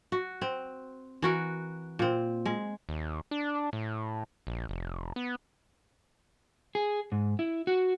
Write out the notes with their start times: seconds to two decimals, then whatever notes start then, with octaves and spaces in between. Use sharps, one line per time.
0.12 F#4
0.41 C4
1.22 E3 F#4 A#4
1.99 A#2 C4
2.46 G#3
2.89 D#2
3.31 D4
3.73 A2
4.47 A#1
4.69 F1
5.16 B3
6.75 G#4
7.12 G#2
7.39 E4
7.67 F#4